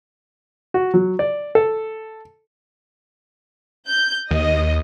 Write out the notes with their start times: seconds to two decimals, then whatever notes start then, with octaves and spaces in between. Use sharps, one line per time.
0.74 F#4
0.94 F#3
1.19 D5
1.55 A4
3.88 G6
4.31 D#2 D#5